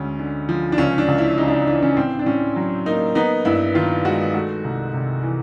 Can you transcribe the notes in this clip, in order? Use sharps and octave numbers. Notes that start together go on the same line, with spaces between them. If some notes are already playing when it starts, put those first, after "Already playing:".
Already playing: D2 G#3 C#4
D3
F3
D4
C#2 C#4
D4
C#2
E4
C#3 D#4
D4
D#4
E3 D4
C#4
A2 C4
D4
A2 C#4
F#3
A#3 D#4
B3 D#4
G2 E4
D#3 F4
G#3 F#4
A3 F#4
C2
C3
E3